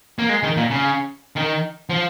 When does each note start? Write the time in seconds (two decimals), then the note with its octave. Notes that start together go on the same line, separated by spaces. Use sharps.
0.19 A#3
0.29 G#3
0.43 D#3
0.57 A#2
0.70 C#3
1.36 D#3
1.89 F3